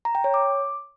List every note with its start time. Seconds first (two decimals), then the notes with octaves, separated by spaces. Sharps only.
0.05 A#5
0.15 G5
0.24 C#5
0.34 D6